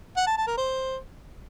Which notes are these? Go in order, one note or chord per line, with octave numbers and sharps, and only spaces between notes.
F#5
A5
A5
A#4
C5